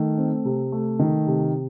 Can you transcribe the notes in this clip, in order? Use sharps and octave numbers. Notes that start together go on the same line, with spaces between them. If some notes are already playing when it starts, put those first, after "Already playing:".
Already playing: D#3 A3
C4
C3
A3
D#3
C3